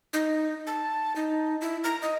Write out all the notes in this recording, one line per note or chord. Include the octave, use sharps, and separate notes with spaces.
D#4
A5
D#4
E4
A#5
D#5